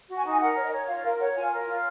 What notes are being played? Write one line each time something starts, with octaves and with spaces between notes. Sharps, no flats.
F#4
G#5
D#4
G#5
A#4 F#5
C#5
D#5
C#5
F4 F5
A#4 F5
C#5 F#5
F4 G#5
A#4
F4